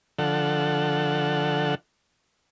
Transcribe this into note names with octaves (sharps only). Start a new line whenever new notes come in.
D3 F3 A4 F#5